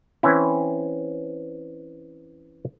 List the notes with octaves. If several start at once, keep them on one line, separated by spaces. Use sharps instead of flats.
E3 C4 C#4 E4